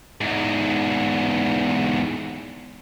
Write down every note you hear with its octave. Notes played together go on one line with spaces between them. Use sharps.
E2 G#2